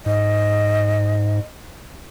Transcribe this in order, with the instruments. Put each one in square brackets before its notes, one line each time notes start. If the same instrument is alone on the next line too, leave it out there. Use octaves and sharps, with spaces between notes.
[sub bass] G#2 [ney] D#5